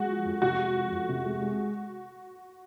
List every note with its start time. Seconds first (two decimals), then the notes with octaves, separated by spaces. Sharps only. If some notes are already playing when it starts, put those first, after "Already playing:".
Already playing: G#3 F#4
0.09 F3
0.25 F2
0.42 C3 F#4
0.59 G#3
0.76 F3
0.92 F2
1.09 C3
1.25 G#3
1.42 G#3